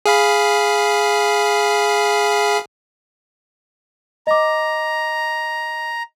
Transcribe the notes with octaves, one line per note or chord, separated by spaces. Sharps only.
G#4 F5 B5
D#5 A#5 D6